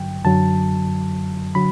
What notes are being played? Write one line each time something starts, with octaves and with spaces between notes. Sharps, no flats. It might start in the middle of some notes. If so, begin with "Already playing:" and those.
Already playing: G2 D3 F#3 G5
F#2 D3 F#3 A5
D3 F#3 B5